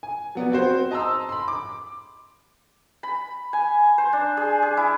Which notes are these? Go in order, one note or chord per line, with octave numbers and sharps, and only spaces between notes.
G#5
F#3 B3 D5
C4 F#4 C5
D#5 A5 A#5 C6 E6
B5 C6
D6
B5
G#5
C5
D4
G#4
G#4
E4